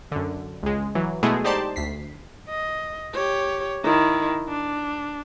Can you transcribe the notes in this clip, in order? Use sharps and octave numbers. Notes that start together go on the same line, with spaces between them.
F#2 D3
C#2 G#3
E3 F#3
B2 G#3 A3 B3 E4 G#4
D#4 G4 C5 D5 A5 C6
D2 B6 C7
D#5
G4 C#5
D#3 E4
D4